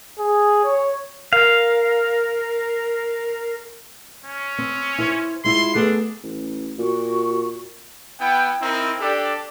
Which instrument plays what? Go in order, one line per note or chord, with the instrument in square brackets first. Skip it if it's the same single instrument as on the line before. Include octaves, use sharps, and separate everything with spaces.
[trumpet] G#4
C#5
[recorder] A#4 [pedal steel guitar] F5
[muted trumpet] C#4
[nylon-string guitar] C4
E4 C5
[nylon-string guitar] G#3 E4 F4 [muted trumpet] C6
[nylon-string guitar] A3 B3 G#4 [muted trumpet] D4
[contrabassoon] A1
[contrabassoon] A#2 [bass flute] F#4
[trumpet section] B3 E4 G5
C4 D#4 E4 A#4
D4 G4 A4 D5